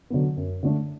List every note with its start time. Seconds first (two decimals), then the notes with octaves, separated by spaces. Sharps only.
0.10 D3 F#3 B3
0.37 F#2
0.63 D3 A3 D4